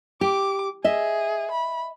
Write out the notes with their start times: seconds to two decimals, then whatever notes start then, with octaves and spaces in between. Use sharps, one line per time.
0.21 G4 D6
0.84 G#4 D#5 E5
1.52 B5